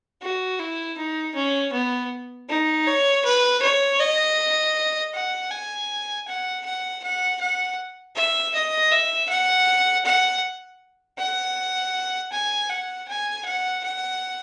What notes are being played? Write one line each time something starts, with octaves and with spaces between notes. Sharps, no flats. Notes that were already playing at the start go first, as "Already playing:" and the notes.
F#4
E4
D#4
C#4
B3
D#4
C#5
B4
C#5
D#5
F#5
G#5
F#5
F#5
F#5
F#5
E5
D#5
E5
F#5
F#5
F#5
G#5
F#5
G#5
F#5
F#5